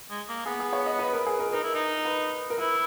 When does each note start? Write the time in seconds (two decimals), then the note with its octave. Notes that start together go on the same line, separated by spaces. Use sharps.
0.10 G#3
0.29 A#3
0.46 B3 G#4
0.60 G#4
0.73 C#5
0.86 D#5
0.99 B4
1.13 A#4
1.26 G#4
1.39 A#4
1.53 D#4 A#4
1.63 E4
1.74 D#4
2.05 B4
2.50 A#4
2.58 E4 B4